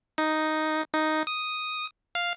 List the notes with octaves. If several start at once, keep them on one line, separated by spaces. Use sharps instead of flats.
D#4
D#4
D#6
F5